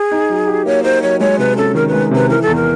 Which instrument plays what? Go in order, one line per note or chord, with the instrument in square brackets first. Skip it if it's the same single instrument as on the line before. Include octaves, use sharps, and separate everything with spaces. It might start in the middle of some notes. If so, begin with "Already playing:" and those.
Already playing: [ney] G#4
[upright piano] D#4
F#3
G4
[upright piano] A#3 [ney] C#5
[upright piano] D#4 [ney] C5
[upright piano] F#3 [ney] C#5
[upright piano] G#3 [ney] C#5
[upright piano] C3 [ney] B4
[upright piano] C#4 [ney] A4
[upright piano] D#3 [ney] A#4
[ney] B4
[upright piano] G#3
[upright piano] C3 [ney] B4
[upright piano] E3 [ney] A#4
[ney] A4
[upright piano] E2
[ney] A#4